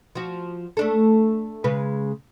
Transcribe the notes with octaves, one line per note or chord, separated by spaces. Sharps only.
F3 F#4
A3 D4 A4
C#3 G#3 B4